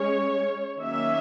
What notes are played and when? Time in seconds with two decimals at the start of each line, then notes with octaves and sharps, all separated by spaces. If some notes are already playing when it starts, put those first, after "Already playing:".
Already playing: G#3 C#4 C#5
0.81 D#3 F#3 A#3 C#4 E5